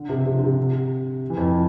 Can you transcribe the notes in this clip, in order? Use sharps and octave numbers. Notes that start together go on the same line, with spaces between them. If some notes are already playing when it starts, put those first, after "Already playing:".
Already playing: D3
C3
C3
D3
C3
E3
F2